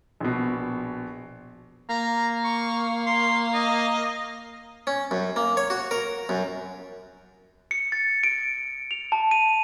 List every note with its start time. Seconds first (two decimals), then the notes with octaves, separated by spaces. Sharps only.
0.20 A#1 B2
1.89 A#3 A#5
2.44 C#6
3.06 C6
3.54 D#5
4.87 C#4
5.11 F#2
5.36 A#3
5.57 C#5
5.70 F#4
5.91 A#4
6.29 F#2
7.71 C#7
7.92 A6
8.23 D7
8.91 F7
9.12 A5
9.31 D#7